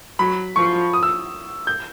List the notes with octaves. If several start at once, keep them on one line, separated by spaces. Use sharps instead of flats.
F#3 B5
F3 C#6
D#6
E6
G6